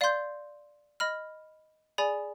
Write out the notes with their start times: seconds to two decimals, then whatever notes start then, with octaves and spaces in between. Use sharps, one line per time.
0.01 D5 F5 C6 G6
1.00 D#5 B5 F6
1.98 G#4 D5 G#5 B5